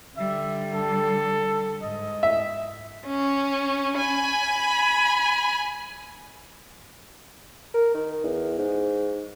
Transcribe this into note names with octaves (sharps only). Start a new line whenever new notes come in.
D3 G3 E5
A4
G#2 D#5
E5
C#4
G#5 B5
A#4
D#3
E2
G#2